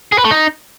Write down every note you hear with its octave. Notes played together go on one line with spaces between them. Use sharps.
G#4
B4
A3
D#4